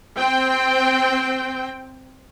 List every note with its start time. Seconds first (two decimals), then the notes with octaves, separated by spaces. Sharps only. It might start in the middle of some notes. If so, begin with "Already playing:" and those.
0.17 C4 G5